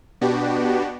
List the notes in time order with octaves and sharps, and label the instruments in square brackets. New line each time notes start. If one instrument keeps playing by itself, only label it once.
[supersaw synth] B2 B3 D4 F#4 G4